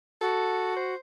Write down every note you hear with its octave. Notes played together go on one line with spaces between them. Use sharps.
F#4 A4
C5